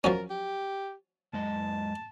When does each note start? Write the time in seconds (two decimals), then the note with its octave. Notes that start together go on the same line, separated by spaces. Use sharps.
0.04 F3 F#3 C#4 A#4
0.30 G4
1.33 F#2 G#3 D#5 A5